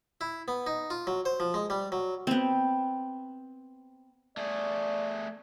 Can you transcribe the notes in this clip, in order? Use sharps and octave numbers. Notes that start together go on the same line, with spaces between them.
E4
B3
D#4
F4
F#3
C5
F3
G#3
G3
F#3
B3 C4
A3 G#4 D5